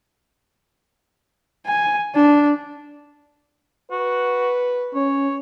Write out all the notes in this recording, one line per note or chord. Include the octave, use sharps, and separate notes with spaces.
G#5
D4
F#4 B4
C#4 C#5